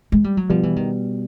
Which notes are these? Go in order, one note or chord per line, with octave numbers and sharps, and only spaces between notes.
G#3
G3
F#3
B2 F3 G3 B3
E3
D#3